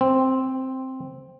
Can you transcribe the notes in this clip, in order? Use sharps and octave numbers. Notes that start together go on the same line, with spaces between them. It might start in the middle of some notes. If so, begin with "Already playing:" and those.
C4